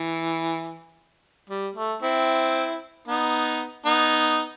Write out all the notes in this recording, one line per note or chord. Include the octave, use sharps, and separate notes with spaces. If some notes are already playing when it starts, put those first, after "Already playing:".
Already playing: E3
G3
A3
C4 E4
B3 D#4
B3 D#4